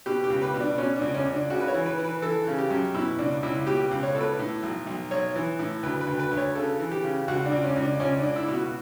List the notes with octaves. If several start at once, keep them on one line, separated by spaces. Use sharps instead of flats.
B2 G4
G4
C#2
B4
B2
D4
B2 C#4
D4
C#2
C#4
C#2
D4
C#3 F#4
B4
C#5
E3
B4
E3
B4
E3 A4
C#3
G4
F#2
B2 E4
C#2 D4
C#2 E4
B2 G4
C#2
C#5
B2 A4
B4
A2
B1
B1
B1 C#5
E3
A2
D2 B4
B4
D2
B4
D2
C#5
C#3 A4
E3
G4
C#3
C#2 F#4
D4
C#2
C#4
C#2
D4
C#2 C#4
D4
C#2
E4
B2
F#4